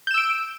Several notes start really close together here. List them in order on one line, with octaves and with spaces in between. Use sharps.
G6 E7 E6 D7